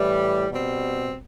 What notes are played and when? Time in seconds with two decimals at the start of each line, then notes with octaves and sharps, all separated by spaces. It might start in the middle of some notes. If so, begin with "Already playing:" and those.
Already playing: A2 E3 G3
0.50 B2 G3 C4